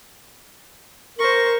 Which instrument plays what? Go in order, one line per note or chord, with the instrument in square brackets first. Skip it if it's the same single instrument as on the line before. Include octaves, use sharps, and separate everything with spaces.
[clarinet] A#4 [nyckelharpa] C5 C#6